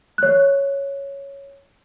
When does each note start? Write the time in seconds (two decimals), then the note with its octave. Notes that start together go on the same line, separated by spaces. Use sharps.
0.18 C#5 F#6